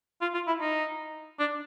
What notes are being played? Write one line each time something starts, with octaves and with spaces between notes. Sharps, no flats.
F4
F4
E4
D#4
D4